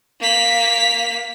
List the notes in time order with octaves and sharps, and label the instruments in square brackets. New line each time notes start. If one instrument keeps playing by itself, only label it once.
[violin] A#3 B6